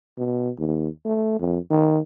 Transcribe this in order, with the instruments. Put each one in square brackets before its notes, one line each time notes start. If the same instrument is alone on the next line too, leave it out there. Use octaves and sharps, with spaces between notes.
[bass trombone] B2
D#2
A3
F2
D#3